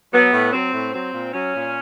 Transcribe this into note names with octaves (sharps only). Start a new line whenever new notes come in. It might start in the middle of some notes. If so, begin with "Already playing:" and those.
F#3 B3
A2
F#3 C4
A2
F#3 C4
A#2
F#3 C#4
A#2